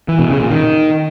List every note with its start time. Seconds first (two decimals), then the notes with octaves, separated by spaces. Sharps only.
0.09 E3
0.19 B2
0.30 C#3
0.40 A#2
0.51 D#3